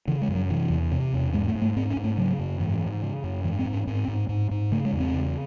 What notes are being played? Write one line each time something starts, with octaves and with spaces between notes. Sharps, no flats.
C#3 E3
G#3
F#2
F#3
C3 E3
E2
C3
E2
G#2 G#3
A3
G#2
A3
G#2 C4
C#4
G#2
A3
C#3 F#3
F#2
G#2 E3
G#2
C#3
F#2
G#2 E3
C4
G#2
C#4
G#2 C4
G#2
G#2
G#2
C#3 A3
G#3
E2
C4
C#3